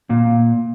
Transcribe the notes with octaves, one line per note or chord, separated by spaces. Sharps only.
A#2